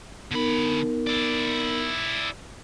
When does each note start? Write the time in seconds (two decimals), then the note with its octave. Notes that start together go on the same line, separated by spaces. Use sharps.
0.31 D3 B3 D#4 A#4 B5
1.07 E4 D5